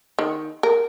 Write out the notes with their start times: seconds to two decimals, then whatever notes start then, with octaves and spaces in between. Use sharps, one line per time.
0.19 D#3
0.63 A#4